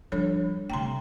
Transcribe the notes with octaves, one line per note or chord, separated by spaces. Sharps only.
F3 G3 D4 A4 C#5
C3 A3 G5 A#5 C6